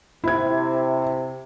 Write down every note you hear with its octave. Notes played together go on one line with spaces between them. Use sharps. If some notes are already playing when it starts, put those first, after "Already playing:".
C3 E4 G#6